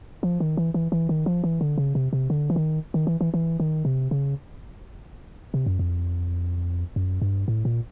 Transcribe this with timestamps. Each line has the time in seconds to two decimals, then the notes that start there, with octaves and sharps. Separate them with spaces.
0.23 F3
0.40 D#3
0.57 E3
0.74 E3
0.92 E3
1.09 D#3
1.26 F3
1.44 E3
1.61 D3
1.78 C#3
1.95 C3
2.13 C3
2.30 D3
2.50 E3
2.56 D#3
2.94 D#3
3.07 E3
3.21 E3
3.34 E3
3.60 D#3
3.85 C3
4.11 C#3
5.54 C3
5.66 F#2
5.79 F2
6.96 F#2
7.22 G2
7.48 A2
7.65 A#2